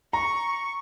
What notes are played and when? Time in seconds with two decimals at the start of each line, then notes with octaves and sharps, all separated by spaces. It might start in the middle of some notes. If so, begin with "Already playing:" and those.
0.13 A#5 C#6